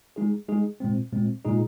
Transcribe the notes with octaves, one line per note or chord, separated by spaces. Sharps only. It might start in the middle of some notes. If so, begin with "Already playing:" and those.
G#3 D#4 G#4
G#3 D#4 G#4
A#2 G#3 C4
A#2 G#3 C4
A#2 G#3 D#4 G#4